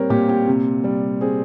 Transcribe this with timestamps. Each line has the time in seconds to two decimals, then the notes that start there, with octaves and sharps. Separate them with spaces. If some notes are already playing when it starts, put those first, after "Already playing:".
Already playing: A#2 G3 C4 A#4 C#5
0.10 A#2 G4
0.29 G4
0.47 C3
0.84 G3
1.21 C4 G#4